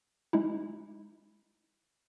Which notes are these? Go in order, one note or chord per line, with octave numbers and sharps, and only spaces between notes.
G#3 C#4 D#4 E4